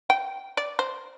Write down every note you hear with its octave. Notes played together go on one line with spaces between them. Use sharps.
G5
D5
C5